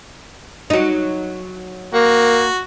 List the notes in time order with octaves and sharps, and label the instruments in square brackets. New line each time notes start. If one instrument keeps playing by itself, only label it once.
[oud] F#3 D#4
[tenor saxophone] A#3 [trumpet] F#4